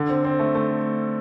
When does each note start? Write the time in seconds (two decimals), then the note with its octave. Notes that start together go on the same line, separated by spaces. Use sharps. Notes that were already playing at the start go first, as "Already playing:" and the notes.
Already playing: D3
0.09 C4
0.24 C4
0.39 A3
0.55 A3